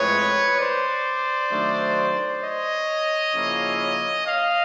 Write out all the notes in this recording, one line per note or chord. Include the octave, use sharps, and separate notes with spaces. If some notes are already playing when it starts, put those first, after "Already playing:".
Already playing: A2 F3 G#3 C4 B4 C#5
C5 D5
D#3 F#3 A3 D4
C#5 D#5
C#3 F3 A#3 C#4 E4
D#5 F5